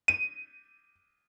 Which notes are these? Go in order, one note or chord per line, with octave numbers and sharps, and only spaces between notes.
D#7